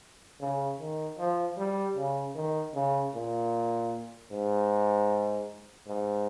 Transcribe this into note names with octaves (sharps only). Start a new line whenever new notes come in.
C#3
D#3
F3
G3
C#3
D#3
C#3
A#2
G#2
G#2